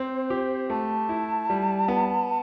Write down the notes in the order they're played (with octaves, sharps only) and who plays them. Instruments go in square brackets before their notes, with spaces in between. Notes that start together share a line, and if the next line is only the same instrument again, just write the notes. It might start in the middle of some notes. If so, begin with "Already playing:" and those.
Already playing: [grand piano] C4 [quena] C5
[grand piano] G4
[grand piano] A3 [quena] A5
[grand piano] E4
G3
B3